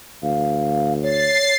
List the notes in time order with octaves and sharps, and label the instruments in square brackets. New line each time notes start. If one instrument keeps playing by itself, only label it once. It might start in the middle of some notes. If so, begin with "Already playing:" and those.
[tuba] D2 [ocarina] F5
[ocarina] C#5 [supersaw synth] A6 C7